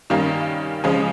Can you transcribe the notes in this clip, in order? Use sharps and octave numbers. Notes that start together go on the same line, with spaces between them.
G2 D#3 G3 A#3 C#4
C#3 F3 G#3 C#4